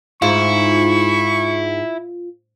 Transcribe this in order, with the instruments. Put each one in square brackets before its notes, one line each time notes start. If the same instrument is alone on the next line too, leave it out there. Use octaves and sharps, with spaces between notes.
[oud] G#2 [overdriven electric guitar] E4 [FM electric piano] F4 [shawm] C#6